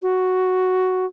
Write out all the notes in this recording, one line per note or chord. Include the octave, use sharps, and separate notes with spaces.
F#4